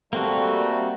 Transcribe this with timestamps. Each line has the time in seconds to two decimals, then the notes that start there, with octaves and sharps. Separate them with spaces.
0.13 G3 A3 A#3 C4 F#4